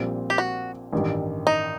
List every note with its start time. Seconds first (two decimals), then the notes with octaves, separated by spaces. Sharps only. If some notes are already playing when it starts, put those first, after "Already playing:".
Already playing: A#1 A#2 G3 C4
0.30 G4
0.38 F#4
0.93 A1 G2 D#3 G3
1.47 D#4